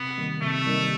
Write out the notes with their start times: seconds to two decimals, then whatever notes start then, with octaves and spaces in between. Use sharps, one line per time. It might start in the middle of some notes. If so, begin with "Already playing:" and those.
Already playing: C3 B3
0.17 D#3 G3 A#3 D#4
0.41 C3 A3
0.66 D#3 G3 A#3 D#4